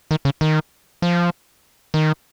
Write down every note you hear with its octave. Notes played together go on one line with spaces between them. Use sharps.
D#3
C#3
D#3
F3
D#3